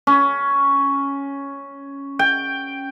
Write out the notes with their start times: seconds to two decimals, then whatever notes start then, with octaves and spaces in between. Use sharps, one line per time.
0.07 C#4
2.19 G5